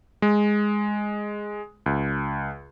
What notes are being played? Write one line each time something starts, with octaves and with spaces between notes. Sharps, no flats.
G#3
C#2